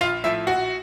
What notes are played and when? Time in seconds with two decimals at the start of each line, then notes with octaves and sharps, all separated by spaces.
0.01 A#1 F4 F5
0.24 A2 F3 E4 E5
0.47 A#1 F#4 F#5